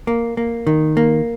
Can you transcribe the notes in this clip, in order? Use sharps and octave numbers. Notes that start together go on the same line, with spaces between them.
A#3
A#3
D#3
A#3